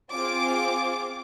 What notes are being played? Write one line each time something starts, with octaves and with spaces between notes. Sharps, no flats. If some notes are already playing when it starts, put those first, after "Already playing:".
C4 F4 G#4 D6